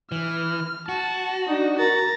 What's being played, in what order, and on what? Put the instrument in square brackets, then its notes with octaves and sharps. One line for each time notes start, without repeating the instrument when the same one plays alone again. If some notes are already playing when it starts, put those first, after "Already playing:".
[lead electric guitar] E3 [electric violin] F6
[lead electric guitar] F#4 [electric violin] A5
[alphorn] D4 [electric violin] D#4
[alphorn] A#4 [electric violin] A#5 A6